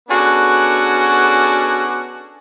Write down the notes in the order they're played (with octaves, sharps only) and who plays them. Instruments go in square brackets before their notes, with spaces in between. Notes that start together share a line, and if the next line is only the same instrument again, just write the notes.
[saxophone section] B3 C#4 D4 F#4 G#4 A4